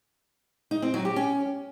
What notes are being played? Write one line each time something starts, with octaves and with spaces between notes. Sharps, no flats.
D#4
C4
F#3
G4
C#4